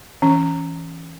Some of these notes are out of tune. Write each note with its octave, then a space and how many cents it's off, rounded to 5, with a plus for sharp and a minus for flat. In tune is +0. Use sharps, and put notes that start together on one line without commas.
E3 +0 C#4 +0